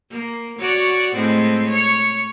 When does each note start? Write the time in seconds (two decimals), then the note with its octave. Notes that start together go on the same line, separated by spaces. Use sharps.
0.10 A#3
0.58 F#4 C#5 D5
1.14 A2 G#3 C4
1.69 C#5